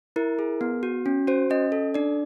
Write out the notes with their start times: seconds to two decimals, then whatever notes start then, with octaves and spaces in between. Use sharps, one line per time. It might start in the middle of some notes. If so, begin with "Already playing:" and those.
0.16 E4 A#4
0.39 G#4
0.61 B3
0.83 F#4
1.06 C#4
1.27 F#4 C5
1.50 C#4 D#5
1.72 A4
1.94 D4 D5